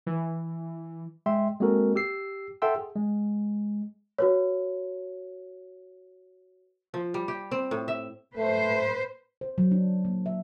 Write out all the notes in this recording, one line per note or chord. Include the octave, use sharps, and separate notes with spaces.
E3
G#3 E5 G5 C6
G#3 A#3 C4 F#4 A4 A#4
G4 E6 C7
A4 E5 F#5 G5 C6 E6
G#4
G#3
F#4 B4 C#5
F3
G3
G4
C4
A2
E5
A3 B4 C5
C5
F#3
D4
A#3
E5